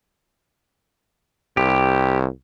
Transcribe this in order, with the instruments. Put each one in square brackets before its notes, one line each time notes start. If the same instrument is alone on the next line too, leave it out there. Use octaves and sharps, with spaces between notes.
[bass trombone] C2 [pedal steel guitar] G4